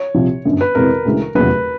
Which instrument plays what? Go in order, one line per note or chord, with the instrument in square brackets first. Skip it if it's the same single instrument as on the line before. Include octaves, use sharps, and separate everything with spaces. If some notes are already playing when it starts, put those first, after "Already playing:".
Already playing: [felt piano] C#5
[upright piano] C2 C3 F3
G1 F#2 D3
[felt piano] B4
[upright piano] F2 C3 E3 G#3 B3 [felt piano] A#4
[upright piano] D2 C#3 E3 G#3
[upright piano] F1 E2 C#3 F#3 [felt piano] B4